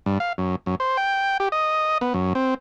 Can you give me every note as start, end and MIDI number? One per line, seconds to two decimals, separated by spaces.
0.06 0.18 43
0.20 0.33 77
0.38 0.56 42
0.66 0.75 42
0.80 0.97 72
0.97 1.37 79
1.40 1.49 67
1.52 1.98 75
2.01 2.13 59
2.14 2.33 42
2.35 2.54 60